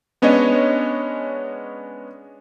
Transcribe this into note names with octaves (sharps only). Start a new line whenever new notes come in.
G#3 B3 C#4 D4 C#5 D#5